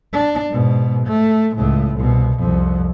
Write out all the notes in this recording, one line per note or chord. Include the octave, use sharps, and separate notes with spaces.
D4
G#2 B2
A3
C#2 A2
C2 B2
C2 F2